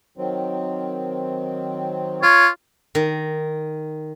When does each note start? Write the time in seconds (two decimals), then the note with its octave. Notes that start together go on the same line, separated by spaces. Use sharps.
0.18 D#3 F#3 C4
2.23 F4 C#5
2.95 D#3